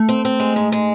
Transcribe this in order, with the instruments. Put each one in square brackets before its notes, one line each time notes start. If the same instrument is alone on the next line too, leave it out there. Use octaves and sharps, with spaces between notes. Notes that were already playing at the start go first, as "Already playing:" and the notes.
Already playing: [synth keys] A3
[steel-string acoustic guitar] C4
C4
G#3
G#2
G#3